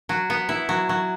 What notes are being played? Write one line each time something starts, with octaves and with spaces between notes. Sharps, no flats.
F#3
B3
E4
F#3
F#3